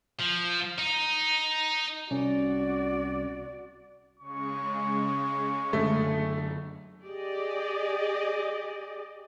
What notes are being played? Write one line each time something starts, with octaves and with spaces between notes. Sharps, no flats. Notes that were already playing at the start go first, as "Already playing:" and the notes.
F3
D#4
C2 C#4 F#4 D5
C#3 G#3 C#6
F#2 D3 F#3 A3
G4 G#4 D5 D#5